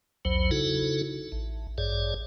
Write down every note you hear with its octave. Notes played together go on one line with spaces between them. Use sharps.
B1 E2 F#3 C5
C#3 D#4 E4 F#4 A4
A1
A1 G2 G#4 C#5 D5